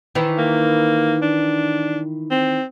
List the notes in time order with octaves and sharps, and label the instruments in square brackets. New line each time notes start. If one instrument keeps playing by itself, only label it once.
[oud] D#3 E3
[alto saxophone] A#3
D4
C4